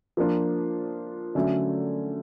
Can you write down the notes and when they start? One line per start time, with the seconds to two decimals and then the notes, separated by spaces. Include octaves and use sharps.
0.17 F3 A#3 D4 F4
1.35 D3 F#3 A3 C#4